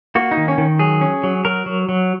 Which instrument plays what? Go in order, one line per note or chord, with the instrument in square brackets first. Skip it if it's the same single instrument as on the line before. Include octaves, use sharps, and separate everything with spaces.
[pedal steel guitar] A#3 F#4
D#4
D#3
C#4
D#3
F#3 G#4
C#4
F#3
F#3 A#4
F#3
F#3